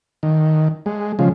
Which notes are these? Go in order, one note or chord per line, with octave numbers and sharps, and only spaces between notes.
D#3
G#3
C#3 F3 G#3